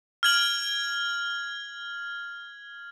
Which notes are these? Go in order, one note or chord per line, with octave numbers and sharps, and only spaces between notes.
F6 G#6 F#7